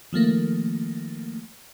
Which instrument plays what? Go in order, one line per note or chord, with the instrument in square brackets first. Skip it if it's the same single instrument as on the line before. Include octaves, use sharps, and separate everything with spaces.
[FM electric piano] D#3 F3 A3 A#3